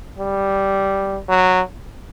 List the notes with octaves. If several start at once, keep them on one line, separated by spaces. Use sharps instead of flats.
G3
F#3